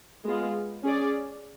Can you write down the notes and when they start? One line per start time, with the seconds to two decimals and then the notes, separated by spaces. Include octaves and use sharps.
0.25 G#3 B3 F4
0.83 C#4 G#4 D5